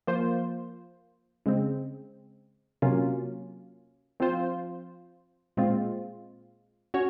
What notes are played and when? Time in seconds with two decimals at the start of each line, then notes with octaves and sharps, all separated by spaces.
0.07 F3 A#3 F4 C5
1.46 C#3 G#3 C4
2.82 C3 F#3 A#3 C#4 F4
4.20 F3 C4 F4 C5
5.57 A#2 G#3 C4 F4
6.94 C#4 F#4 C#5